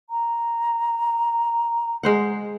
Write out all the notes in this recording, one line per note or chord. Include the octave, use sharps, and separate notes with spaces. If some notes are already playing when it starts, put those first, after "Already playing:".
A#5
G#3 C5 F#5